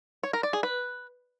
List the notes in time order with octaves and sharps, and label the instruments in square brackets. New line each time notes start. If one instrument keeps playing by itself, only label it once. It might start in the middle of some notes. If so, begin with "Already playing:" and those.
[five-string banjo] C#5
A#4
D5
G#4
B4